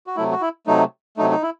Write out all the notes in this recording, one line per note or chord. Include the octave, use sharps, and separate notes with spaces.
F#4
C3 F#3 A3 E4
F#4
E4
C3 F#3 A3 D#4
C3 F#3 A3 D#4
D#4
E4